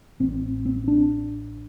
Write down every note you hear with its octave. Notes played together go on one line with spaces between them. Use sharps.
A1 A2 C4
C4
D4